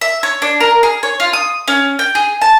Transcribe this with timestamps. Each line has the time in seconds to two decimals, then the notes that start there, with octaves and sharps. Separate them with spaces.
0.01 E5
0.23 C#5
0.42 D4
0.60 A#4
0.83 G#4
1.03 C#5
1.20 F4
1.33 D#6
1.68 C#4
1.99 G5
2.15 G#4
2.42 A5